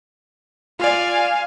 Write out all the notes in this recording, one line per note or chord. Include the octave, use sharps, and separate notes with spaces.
F4 D5 F5 G#5